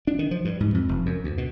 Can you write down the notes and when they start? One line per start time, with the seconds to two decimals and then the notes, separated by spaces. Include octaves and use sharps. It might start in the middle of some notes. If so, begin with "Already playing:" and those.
0.07 D4
0.19 D#3
0.31 F3
0.45 G2
0.60 G#2
0.74 F2
0.89 F1
1.06 F#2
1.24 D2
1.38 B2